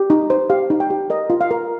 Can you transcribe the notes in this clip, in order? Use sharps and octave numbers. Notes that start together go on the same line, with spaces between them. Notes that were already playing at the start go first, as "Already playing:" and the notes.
Already playing: G4
D#4
C5
G4 F5
D#4
G5
G4
A#4 D#5
F4
F5
A#4